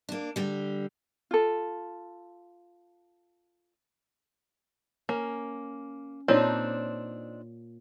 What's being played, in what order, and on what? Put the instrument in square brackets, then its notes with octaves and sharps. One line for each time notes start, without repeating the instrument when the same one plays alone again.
[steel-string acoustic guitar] A#3 D4
D3 G3
[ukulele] F4 A4
[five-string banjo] A#3 [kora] C#4
[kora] A#2 [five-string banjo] C4 D4 D#4 [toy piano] C#5